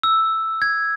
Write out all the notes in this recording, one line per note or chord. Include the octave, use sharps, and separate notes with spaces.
E6
G#6